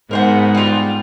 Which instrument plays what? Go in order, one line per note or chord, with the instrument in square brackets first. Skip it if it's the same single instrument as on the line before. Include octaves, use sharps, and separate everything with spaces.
[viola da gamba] G#2 B3 [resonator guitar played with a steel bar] A#4 C5 F#5
[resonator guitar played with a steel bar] G3 F4